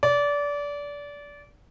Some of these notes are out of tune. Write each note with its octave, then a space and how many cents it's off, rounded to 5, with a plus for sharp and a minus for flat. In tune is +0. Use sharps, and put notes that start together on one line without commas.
D5 -25